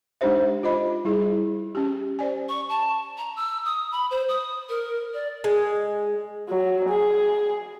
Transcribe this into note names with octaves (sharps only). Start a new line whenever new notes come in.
G#3 D4 D#4 G4 C5 E5
F4 C5 D#5 B5
G3 E4 G#4
C#4 G4
C5 D5 G#5
C#6
A5
A#5
E6
D#6
B5
C5
D#6
A#4
D5
G#3
F#3
G#4